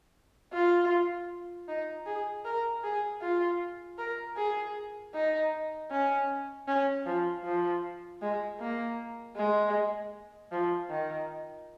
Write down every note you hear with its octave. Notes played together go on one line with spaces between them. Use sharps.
F4
D#4
G#4
A#4
G#4
F4
A#4
G#4
D#4
C#4
C#4
F3
F3
G#3
A#3
G#3
F3
D#3